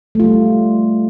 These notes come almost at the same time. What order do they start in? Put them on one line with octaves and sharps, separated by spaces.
A3 F4 G3